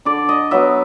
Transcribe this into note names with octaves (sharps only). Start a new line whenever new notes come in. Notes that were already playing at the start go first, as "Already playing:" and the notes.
D3 D5
D#5
F#3 B3 E5